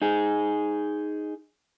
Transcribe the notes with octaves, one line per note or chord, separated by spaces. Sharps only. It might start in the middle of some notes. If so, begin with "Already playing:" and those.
D#4 G#4